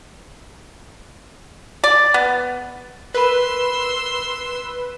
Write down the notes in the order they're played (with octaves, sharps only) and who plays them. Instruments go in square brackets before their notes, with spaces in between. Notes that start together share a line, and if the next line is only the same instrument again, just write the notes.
[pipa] D5
B3
[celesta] A#4 B5 [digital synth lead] B4 [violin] C6 E6